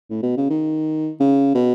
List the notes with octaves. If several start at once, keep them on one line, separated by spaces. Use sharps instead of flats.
A2
B2
C#3
D#3
C#3
B2